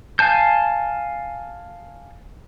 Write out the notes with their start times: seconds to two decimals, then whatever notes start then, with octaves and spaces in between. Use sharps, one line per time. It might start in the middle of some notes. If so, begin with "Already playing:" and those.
0.19 F5 G#5 A5 G6